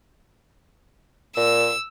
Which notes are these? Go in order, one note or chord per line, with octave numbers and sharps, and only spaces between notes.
A#2 E6